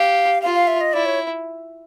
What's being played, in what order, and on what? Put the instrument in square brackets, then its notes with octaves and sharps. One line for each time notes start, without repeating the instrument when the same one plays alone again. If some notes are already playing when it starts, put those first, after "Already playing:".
Already playing: [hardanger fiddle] G4 [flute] F5
[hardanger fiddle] F4 [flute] F5
[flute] F5
E5
D#5
[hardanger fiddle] E4 [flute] D5
[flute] C#5